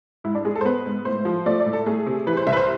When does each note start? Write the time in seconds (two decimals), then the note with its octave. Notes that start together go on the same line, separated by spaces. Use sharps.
0.24 G#2 E4
0.35 D4
0.45 G#3 G#4
0.55 A4
0.61 C5
0.65 B3 B4
0.86 G#2
1.05 A2 C5
1.25 F3
1.46 A3 D5
1.60 D5
1.66 A2
1.73 A4
1.86 A3 G#4
2.07 C3
2.27 E3 B4
2.37 C5
2.47 C2 E5
2.53 B4
2.57 C5